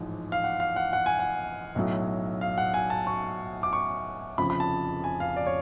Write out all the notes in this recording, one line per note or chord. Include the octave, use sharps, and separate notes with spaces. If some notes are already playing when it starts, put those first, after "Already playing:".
Already playing: A1 G#2 F3
F5
F#5
F5
F#5
F#5
G#5
F#5
B1 A2 F#3
F5
F#5
G#5
A5
C#6
D6
C#6
F1 F2 C#3 F3 B5
B5
A5
G#5
F5
D5
C#5